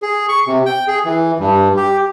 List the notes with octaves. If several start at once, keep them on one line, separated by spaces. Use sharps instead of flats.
G#4
C#6
C3
G5
G#4
E3
G2
G4